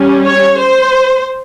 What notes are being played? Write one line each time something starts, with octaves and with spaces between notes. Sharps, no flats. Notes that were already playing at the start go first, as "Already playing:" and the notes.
Already playing: G3 C#4
C#5
C5